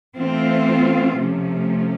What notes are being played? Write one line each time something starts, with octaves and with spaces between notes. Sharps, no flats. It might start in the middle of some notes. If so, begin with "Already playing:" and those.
E3 A3 C4 F4
C3 F3 A3 C#4